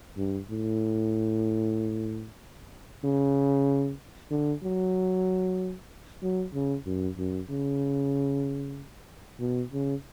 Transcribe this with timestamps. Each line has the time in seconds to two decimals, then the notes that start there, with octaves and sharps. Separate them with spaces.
0.17 G2
0.50 A2
3.04 C#3
4.31 D3
4.64 F#3
6.22 F#3
6.54 C#3
6.86 F#2
7.18 F#2
7.50 C#3
9.40 B2
9.73 C#3